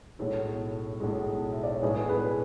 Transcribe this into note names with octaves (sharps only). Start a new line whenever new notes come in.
B1 A2 G#3 A4 C#5
B1 A2 G#3
E5
D5
C#5
B1 A2 G#3 G#4 B4
G#4 B4